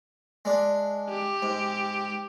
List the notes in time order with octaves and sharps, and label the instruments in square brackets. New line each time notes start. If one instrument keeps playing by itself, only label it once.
[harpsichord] G#3 D4
[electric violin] G4
[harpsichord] G#2